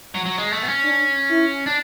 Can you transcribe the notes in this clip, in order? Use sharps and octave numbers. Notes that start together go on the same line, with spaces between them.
F#3
F#3
G#3
A3
B3
C#4
D4
E4
D4